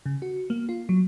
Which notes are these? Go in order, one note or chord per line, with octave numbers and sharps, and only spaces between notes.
C#3
F#4
A#3
F4
F#3